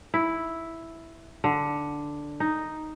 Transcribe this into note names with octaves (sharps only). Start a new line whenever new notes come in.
E4
D3
D#4